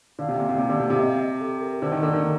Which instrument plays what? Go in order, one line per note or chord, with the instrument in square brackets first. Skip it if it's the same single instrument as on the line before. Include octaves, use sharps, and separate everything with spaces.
[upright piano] D3 [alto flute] F5
[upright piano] C3
A#2
C3
C3
D3
C3
[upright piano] C3 [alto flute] F5
[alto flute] D#5
F5
D#5
G4
A4
A#4
[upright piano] D3 [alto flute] C5
[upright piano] D#3 [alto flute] A#4
[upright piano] D3 [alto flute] A4
[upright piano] D#3 [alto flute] D4
[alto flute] A#3